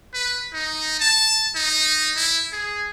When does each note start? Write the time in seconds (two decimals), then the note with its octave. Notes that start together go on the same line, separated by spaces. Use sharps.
0.14 B4
0.53 D#4
1.00 A5
1.55 D#4
2.16 E4
2.52 G#4